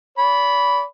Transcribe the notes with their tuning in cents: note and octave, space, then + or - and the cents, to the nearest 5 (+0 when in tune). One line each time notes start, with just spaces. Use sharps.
D5 -40 B5 +0